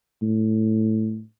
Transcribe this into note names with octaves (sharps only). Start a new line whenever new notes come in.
A2